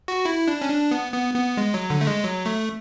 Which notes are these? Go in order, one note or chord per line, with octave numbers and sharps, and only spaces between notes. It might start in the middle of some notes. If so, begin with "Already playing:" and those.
F#4
E4
D4
C#4
D4
B3
B3
B3
G#3
F#3
D3
A3
G#3
F#3
A3